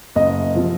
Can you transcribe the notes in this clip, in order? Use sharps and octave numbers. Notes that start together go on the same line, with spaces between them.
F#1 D#5
C3 F3